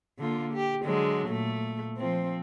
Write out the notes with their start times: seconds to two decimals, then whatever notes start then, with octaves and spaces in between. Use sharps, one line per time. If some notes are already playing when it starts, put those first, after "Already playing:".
0.19 D3 A#3 F4
0.54 G4
0.83 D3 F#3 G#3
1.28 A#2 A3
1.97 F3 C4